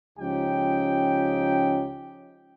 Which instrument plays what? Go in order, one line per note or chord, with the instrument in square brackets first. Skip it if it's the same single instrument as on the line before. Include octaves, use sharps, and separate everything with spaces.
[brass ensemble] C#2 F3 C#4 D#4 G4 G5